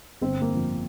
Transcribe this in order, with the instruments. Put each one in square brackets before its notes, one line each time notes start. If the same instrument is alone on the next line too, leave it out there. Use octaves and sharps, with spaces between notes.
[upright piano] G1 C4
A#3
F2 D3 F3